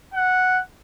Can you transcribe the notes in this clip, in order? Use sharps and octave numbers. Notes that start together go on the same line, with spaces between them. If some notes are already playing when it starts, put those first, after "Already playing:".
F#5